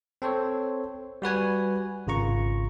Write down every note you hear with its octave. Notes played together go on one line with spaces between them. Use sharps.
C4 A4 C5 C#5
G3 F#4 B4 G#5
G#1 C#3 F4 A#5 C#6